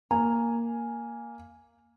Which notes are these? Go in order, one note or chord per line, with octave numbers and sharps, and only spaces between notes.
A#3 G#5 A#5